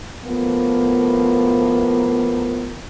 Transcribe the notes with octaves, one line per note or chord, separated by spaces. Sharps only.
A2 F3 A#3 B3